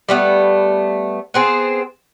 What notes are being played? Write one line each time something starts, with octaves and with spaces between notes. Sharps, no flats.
G3 A3 B3
B3 C4 G#4